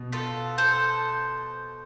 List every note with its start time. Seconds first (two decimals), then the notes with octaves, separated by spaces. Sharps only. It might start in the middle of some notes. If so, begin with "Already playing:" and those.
Already playing: B2
0.12 F4 A4
0.58 A4 C5